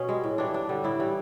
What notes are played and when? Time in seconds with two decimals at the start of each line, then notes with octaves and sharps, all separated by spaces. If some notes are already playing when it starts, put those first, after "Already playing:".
Already playing: B2 C#4
0.08 G3 G#3
0.24 A2
0.38 E3 G3 D4
0.53 G2 D4
0.69 D3 G3
0.84 A2 E4
0.99 E3 G3